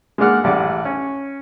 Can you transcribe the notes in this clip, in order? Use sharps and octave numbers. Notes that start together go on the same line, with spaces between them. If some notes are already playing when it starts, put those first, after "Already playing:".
G#3 A#3 D4 D5 F#5 F6
A1 G3 D5 F#5
C#4